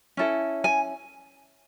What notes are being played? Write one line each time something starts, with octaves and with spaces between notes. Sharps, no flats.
C#4 E4 A4
G#5